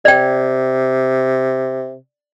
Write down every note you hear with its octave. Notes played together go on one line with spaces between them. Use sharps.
C3 D5 G5